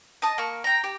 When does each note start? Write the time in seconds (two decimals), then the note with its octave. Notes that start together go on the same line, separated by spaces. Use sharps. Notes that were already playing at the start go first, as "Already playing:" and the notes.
0.22 D#5 A5 D#6
0.38 A#3 C#6
0.64 G5 A#5
0.84 G4